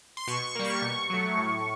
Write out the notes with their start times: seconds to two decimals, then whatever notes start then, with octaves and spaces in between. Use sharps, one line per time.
0.17 C6
0.27 B2 C#6
0.46 C#6
0.55 G3 A#3
0.65 C#6
0.82 B2
1.10 F#3 A3
1.37 A2